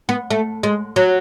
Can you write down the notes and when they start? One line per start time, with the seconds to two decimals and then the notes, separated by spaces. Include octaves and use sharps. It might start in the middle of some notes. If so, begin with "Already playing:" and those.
0.09 B3
0.31 A3
0.63 G#3
0.96 F#3